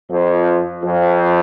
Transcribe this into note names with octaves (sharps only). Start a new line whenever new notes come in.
F2 F3
F2 F3